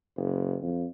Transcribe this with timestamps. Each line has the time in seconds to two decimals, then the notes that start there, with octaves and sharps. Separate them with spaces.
0.16 F#1
0.62 F2